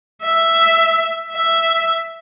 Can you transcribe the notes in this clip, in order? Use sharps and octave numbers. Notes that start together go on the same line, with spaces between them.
E5
E5